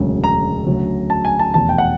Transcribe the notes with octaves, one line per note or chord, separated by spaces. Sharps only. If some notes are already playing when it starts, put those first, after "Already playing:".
Already playing: E1 D2 C#3 F#3
A#5
D2 C#3 F#3
A5
G#5
A5
F1 E2 B2 A5
G5
F#5